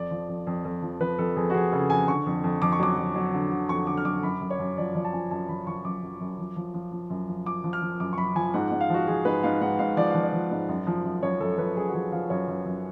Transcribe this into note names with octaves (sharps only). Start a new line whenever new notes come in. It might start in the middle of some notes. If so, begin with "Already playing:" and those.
Already playing: F2 D5
F3
F2
F2
F2
F3
F3 B4
F2 A4
F2 G#4
F#4
F2 G#4
C#3 A4
F2 G#5
D3 C#6
F2
F2
F2 D6
C#6
F#3 D6
F#3
F#3
D3
D3
F2 C#6
D3 D6
F6
F#3 D6
F#2 B5
F#2
C#5
F#2
F3 D5
F3 D5
A5
F3 G#5
F#2 A5
F3 B5
F3 C#6
F#2 D6
F#2
F#2
F3
F3
F3
F3
F#2
F3
F3 D6
F3
F6
F3
F#2 D6
C#6
F#2 B5
F3 G#5
G#2 F#5
G#2 F#5
F5
F3 F#4
F3 G#4
G#2 B4
G#2 F5
G#2 F#5
G#2 F5
F3 D5
F3 F5
D5
F3
G#2
F#2
F3
F#2
F#2 C#5
F#2 A4
F3 B4
F#2 G#4
F#4
F3 G#4
F3 F5
F#2 C#5
F#2
F#2